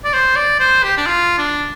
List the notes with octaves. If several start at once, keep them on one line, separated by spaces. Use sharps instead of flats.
D5
C5
D5
C5
G4
D4
F4
D4